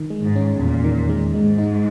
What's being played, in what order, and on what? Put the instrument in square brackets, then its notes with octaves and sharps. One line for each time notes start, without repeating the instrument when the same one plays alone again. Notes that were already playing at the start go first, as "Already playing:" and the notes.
Already playing: [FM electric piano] D#3
G#3
[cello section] G#2
[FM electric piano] C#4
[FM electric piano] E2 [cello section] A#2
[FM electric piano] D#3
G#3
[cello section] G#2 [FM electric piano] G#3
[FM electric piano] D#4